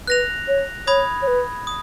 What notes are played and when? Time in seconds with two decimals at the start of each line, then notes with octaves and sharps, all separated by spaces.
0.07 B4 F#6 A#6 F7
0.48 C#5
0.87 C#5 B5 D#6 G#6
1.22 C#5
1.27 B4
1.67 D#6